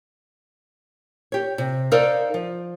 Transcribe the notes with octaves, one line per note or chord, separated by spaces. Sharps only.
G4 C#5
C3
D#4 A4 A#4 C5 D5 F5
F3